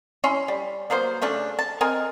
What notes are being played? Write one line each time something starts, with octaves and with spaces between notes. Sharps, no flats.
C#4 E4 C#5 C6
G3
F#3 A#3 B3 C5
C#3 A3 C#4 D4
A5
C4 A#4 D#5 G#5